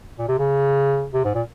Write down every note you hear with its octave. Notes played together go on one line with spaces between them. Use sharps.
A#2
C3
C#3
C3
G#2
A#2